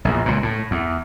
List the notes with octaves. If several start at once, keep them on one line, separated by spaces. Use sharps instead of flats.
A#1 E2 A#2
C#2 A#2
A2
E2